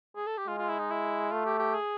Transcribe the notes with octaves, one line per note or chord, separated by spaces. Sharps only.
G#4
A4
G4
G#3 F4
F4
E4
D#4
E4
A3 F4
G4
G4
G#4